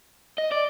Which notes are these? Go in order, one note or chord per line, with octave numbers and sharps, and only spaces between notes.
D#5
D5